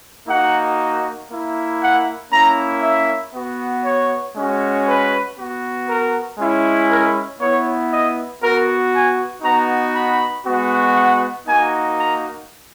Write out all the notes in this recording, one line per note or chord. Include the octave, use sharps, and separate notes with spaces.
A#3 D#4 F#4 F#5
A#3 E4
F#5
A#3 C#4 E4 A#5
E5
B3 F#4
C#5
G#3 C#4 F#4
B4
B3 F#4
A#4
G#3 C#4 E4
A#4
B3 E4 C#5
D#5
B3 F#4 A#4
G#5
B3 D#4 F#4 A#5
B5
G#3 B3 F#4
F#5
A#3 D#4 F#4 G#5
A#5